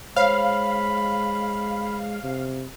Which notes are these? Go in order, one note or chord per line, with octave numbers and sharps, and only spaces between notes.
G#3 C5 C#5 F5 B5
C3